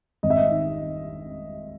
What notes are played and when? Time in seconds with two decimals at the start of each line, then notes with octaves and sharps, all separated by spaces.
0.23 G#1 D#5
0.30 E5
0.37 D#5
0.51 D#3